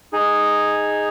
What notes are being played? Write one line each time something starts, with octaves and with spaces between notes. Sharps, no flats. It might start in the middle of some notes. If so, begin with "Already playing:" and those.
D#4 G#4